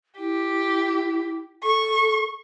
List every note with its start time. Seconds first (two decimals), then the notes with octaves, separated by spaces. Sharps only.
0.19 E4 G4
1.64 A4 C#6